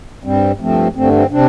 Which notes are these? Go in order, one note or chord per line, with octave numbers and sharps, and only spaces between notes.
G2 G3 C4
G2 F3 A3 C4
G2 D3 A3 C4
C4
C3 G3 C4 D4